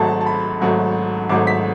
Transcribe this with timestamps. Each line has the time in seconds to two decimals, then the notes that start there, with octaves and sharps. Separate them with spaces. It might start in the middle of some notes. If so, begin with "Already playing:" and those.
Already playing: G#1 G#2 F#3 A3 A5
0.21 A5
0.26 B5
0.61 G#1 G#2 F#3 A3
1.29 G#1 G#2 F#3 A3 D6
1.47 B6